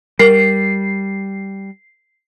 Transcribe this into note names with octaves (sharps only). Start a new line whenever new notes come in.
G3 A#4 C7